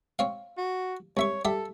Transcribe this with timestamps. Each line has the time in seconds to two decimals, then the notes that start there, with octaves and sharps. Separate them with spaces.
0.19 C4 C#5 F5
0.58 F#4
1.17 C2 C#5 E5 C#6
1.45 G3 G4 A4 E5